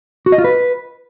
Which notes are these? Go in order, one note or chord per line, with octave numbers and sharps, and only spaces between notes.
F#4
D#5
F4
B4